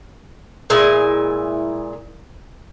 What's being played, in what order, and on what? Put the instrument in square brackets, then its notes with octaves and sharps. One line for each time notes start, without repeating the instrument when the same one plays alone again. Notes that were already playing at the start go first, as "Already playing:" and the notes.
[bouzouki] A#2 G#3 E4 G#5